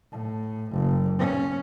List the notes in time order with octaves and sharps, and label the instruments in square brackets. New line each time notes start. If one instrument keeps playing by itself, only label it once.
[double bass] A2
F#1
C#4